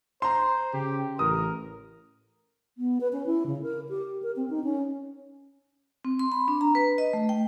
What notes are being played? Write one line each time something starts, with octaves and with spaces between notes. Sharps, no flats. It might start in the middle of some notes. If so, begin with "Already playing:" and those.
C5 A#5 C6
C#3 G4
A1 A#4 D#6
B3
B4
C#4
E4
C#3
A#4
G4
A#4
C4
D#4
C#4
C4
C6
B5
D4
A#5
B4
D#5
A3
G5